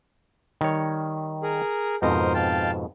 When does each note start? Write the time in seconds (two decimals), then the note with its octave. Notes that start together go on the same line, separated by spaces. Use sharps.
0.61 D#3 G3 C#5
1.43 G#4 A#4
2.02 F2 G#2 B2 A#4 C5 D#5
2.34 F5 G5 A5